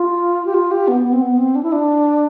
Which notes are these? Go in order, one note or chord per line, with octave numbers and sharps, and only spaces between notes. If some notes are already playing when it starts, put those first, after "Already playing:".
Already playing: F4
G4
F4
G4
B3
B3
C4
B3
C4
D4
E4
D4